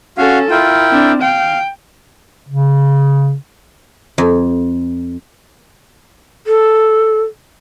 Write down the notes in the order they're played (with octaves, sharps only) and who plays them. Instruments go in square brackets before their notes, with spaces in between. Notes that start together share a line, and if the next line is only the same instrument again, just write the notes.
[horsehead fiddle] C#4 A4 [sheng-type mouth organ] F#4 F5
[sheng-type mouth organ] E4 A#4 G5 [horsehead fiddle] F4
[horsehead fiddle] C4 D4
[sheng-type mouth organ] F5 [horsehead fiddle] G5
[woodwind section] C#3
[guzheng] F2
[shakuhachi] A4